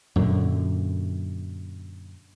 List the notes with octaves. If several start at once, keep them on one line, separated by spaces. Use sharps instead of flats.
F#2 A#2 D3